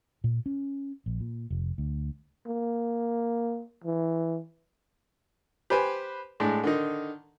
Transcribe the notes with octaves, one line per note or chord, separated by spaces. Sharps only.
A#2
C#4
A#1
A#2
F1
D2
A#3
E3
G4 B4 C5 G#5
A2 G#3 D4
D3 D#3 D#4